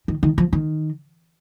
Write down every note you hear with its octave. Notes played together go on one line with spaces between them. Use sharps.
D#3
D#3
F3
D#3